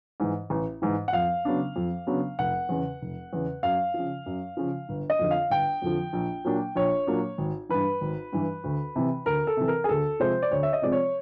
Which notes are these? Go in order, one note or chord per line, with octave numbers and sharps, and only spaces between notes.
G#2 E3
A1
G#2 E3
F#5
F2 F5
C#3 F#3 B3 D4
F2
C#3 F#3 B3 D4
F1 F#5
E2 C#3
F1
E2 C#3
F#2 F5
C#3 F3
F#2
C#3 F3
G1
D#5
F2 D3 F3
F5
G1 G5
F2 D3 F3
A#1
A#2 F#3 A#3 D4
A#1 C#5
A#2 F#3 A#3 D4
G#1
G2 E3 B4
G#1
G2 E3
D2
C3 E3
D2 A#4
A4
C3 E3
A#4
G#4
D2 A4
C3 F3 G#3 C4 C5
D5
D2 C#5
E5
D#5
C3 F3 G#3 C4 D5
C#5